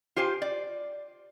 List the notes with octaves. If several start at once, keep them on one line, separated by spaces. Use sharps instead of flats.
F4 G4 C5 G#5
D5